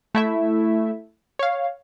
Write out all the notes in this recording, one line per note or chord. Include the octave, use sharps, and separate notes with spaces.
A3 E4 E5
C#5 F5